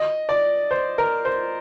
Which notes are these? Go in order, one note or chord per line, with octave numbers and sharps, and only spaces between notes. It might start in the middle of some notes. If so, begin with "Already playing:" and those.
Already playing: D#5
D5
C5
A#4
C5